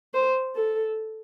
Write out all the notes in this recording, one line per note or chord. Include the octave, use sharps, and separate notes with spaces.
C5
A4